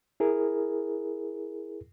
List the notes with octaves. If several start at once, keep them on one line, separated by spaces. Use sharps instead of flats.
E4 G#4 A#4